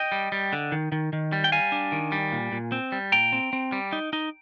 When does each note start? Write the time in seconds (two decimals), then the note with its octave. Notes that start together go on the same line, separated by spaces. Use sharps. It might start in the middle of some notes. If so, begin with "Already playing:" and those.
Already playing: D#5 G5
0.12 G3
0.32 G3
0.53 D3
0.72 D#3
0.92 D#3
1.13 D#3
1.32 G3
1.44 G5
1.52 G3 F5 G#5
1.72 D4
1.92 D#3
2.12 G3
2.32 A#2
2.52 A#2
2.72 C4
2.92 G3
3.12 A#2 G5 A#5
3.32 C4
3.53 C4
3.72 G3
3.93 D#4
4.13 D#4